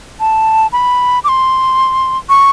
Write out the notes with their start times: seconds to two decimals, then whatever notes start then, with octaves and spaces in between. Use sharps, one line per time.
0.20 A5
0.72 B5
1.24 D6
1.29 C6
2.29 C#6